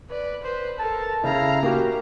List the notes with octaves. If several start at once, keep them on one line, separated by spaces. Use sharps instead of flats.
B4 D5
B4 C5
A4 A#4 A5
C#3 E4 F5 A#5
A#3 F#4 G4